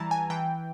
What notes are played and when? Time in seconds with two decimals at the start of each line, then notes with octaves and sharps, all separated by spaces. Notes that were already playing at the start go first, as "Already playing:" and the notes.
Already playing: E3 G3 A5 A#5
0.11 G#5
0.30 E3 G5